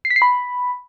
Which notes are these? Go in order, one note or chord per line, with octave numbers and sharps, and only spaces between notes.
C7
B6
C7
B5